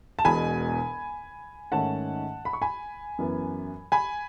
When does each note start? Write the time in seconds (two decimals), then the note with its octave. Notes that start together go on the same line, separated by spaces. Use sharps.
0.19 A5
0.25 E1 E2 B2 G#3 G#5 B5
1.72 G#2 D#3 A3 C#4 F#5 A5
2.45 B5
2.53 C#6
2.62 G#5 B5
3.19 F#2 E3 B3
3.92 G#5 B5